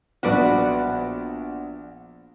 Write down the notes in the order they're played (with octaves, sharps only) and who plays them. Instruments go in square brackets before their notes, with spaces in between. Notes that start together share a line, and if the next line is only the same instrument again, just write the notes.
[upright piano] A#1 B3 [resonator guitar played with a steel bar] F#4 B4 D5